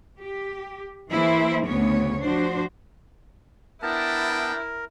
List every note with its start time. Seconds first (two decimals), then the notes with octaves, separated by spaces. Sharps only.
0.21 G4
1.11 E3 A#3 E4 G#4 C5
1.66 D2 C#3 B3 C#5
2.21 F3 D4 F#4 C5
3.82 B3 D4 E4 A#4 B4 G5 A5